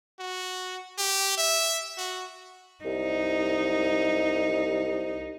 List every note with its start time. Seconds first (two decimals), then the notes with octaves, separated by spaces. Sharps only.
0.20 F#4
0.98 G4
1.37 E5
1.98 F#4
2.85 C2 D#4